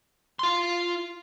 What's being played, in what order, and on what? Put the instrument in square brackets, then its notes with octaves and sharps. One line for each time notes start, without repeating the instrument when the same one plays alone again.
[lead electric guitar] F4 C6